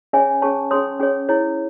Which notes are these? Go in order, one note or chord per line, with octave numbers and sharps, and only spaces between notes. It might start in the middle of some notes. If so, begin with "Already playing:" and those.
C#4 G#4 C#5 E5 G#5
C#4 G#4 C#5 A5 C#6
C#4 G#4 C#5 C6 D#6
C#4 G#4 C#5
E4 G#4 C#5